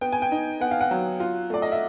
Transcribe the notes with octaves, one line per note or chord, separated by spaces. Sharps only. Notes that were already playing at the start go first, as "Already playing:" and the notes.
B3 G5
G#5
G5
D#4
B3 F#5
F5
F#5
F#3
F4
A3 D5
D#5
E5